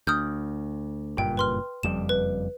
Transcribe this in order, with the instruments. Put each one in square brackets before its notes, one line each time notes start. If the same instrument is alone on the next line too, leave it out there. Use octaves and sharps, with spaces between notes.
[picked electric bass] D2 [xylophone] D#6 F6 G6
[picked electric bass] F#1 G2 A#2 [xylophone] G5
[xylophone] B4 C6 F6
[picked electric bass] F#1 F2 G3 [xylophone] E7
[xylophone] B4